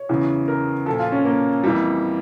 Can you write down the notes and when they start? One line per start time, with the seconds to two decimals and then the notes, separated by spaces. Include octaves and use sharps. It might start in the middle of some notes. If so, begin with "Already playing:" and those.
Already playing: C#5
0.09 E2 C#3 E3
0.48 A#4
0.86 A#2 F3 A4
0.99 F4
1.12 C#4
1.25 A#3
1.64 F2 E3 G3